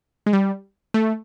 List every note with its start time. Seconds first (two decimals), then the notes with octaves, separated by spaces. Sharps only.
0.26 G#3
0.33 G3
0.94 A3